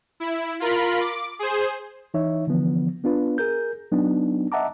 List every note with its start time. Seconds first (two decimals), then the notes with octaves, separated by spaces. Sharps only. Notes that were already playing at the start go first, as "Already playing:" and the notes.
0.20 E4
0.60 F4 A#4 B5
1.00 D6
1.39 G#4 C5
2.14 E3 D#4 C#5 E5
2.47 D3 E3 F3 B3
3.04 B3 D4 F4 B4
3.38 G#4 A#4 G6
3.92 F#3 B3 D4 D#4
4.52 D#5 E5 F#5 A5 A#5 D6